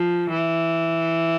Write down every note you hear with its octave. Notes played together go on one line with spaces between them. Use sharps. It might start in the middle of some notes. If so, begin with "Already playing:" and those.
Already playing: F3
E3